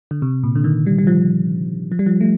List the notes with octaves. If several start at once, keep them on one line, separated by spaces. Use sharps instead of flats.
D3
C3
A#2
D3
D#3
G3
G3
F3
F3
G3
F3
A3